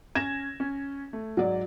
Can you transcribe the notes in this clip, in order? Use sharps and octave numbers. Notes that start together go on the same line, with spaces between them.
C#4 G#5 G#6 A#6 E7
C#4
A3
G#2 F#3 D5